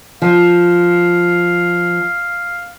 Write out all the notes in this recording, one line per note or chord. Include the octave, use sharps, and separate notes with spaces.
F3 F5